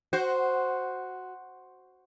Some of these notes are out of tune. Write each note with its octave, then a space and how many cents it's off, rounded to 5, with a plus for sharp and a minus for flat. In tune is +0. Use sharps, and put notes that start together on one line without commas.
F#4 +0 C5 +0